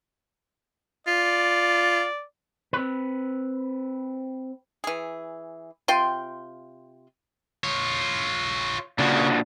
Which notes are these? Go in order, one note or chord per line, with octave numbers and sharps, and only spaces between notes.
F4 D5
C4 B4
E3 G#4
C3 F4 G5 C6
F4 C#5
A#2 C#3 D4 F#4